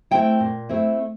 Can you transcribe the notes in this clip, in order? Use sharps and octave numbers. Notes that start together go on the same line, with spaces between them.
A3 C4 E4 G5
A#2
A3 C4 E4